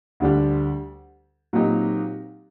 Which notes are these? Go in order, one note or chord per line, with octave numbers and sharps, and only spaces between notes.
D2 D3 G3 D4 G4
A#2 F#3 C4 D#4 G4